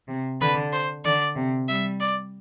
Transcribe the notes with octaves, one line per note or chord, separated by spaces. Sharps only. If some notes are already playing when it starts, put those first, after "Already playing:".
C3
D3 B4
C5
D3 D5
C3
G3 E5
D5